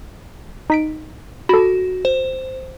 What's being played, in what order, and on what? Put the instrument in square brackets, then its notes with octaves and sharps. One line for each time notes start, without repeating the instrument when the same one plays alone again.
[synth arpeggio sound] D#4 B6 D7
[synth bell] F#4 [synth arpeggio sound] A4 B5
[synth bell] C5